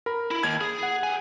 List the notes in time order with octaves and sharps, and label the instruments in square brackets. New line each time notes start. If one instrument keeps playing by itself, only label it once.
[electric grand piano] A#4 B5
[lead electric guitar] E4
[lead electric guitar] D#2 [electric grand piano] G#6
[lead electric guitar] G#4
[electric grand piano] F#5
[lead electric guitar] G4 G#5